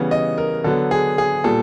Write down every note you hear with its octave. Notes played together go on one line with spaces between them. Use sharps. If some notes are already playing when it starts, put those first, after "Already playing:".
Already playing: C#3 E3 G3 B3
D#5
A#4
D3 F#3 B3 A4
G#4
G#4
A#2 G3 B3 A4